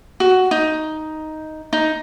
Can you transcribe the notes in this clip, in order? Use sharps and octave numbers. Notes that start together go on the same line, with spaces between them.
F#4
D#4
D#4